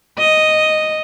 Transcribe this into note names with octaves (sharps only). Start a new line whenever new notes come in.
D#5